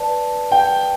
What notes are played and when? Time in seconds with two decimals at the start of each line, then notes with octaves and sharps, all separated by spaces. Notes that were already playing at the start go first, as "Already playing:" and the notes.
Already playing: B4 D5 A5
0.52 G5